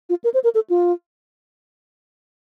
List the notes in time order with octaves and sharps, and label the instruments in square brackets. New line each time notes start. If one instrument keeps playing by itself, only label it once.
[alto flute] F4
A#4
C5
A#4
A4
F4